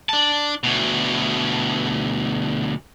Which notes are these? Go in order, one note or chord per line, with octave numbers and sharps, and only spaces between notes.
D4 A5
D2 B2